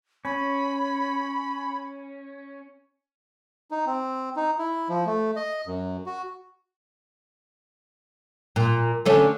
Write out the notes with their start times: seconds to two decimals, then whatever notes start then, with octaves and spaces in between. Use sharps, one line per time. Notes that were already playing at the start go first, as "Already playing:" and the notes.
0.25 C#4 B5
3.71 D#4
3.86 C4
4.36 D#4
4.58 E4
4.89 F3
5.06 A3
5.36 D#5
5.66 F#2
6.06 F#4
8.56 A#2
9.06 D3 A3 C#4